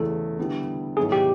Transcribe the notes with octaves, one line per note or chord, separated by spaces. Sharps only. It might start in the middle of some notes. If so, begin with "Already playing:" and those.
Already playing: E2 C#3 E3 A3 A4
D3 G3 B3 E4
G#2 D#3 F#3 B3 E4 G#4
G4